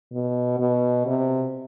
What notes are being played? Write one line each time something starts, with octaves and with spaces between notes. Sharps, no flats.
B2
B2
C3